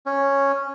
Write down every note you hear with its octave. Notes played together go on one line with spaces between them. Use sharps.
C#4